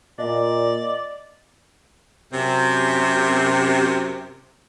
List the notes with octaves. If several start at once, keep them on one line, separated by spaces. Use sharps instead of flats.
A#2 D5 D#5
F#2 C3